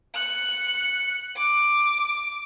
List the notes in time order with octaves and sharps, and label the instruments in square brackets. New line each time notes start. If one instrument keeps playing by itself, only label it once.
[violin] F#6 C#7
D6